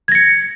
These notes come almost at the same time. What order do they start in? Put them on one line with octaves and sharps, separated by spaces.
G#6 A#6 C#7